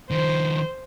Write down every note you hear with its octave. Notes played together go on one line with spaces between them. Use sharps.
D#3 F3 C5